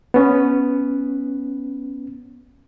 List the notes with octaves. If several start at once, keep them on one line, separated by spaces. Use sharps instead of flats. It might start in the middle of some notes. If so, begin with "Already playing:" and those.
B3 C#4